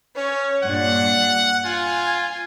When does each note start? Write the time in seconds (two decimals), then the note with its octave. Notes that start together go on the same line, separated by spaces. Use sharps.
0.16 C#4 C#5
0.64 G2 A#2 D4 F#5
1.65 F4 G#5